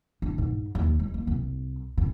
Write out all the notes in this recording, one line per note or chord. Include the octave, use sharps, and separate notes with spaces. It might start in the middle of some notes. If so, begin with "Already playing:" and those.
D4
G#2
D#2
G#3
A#3
C2
C#3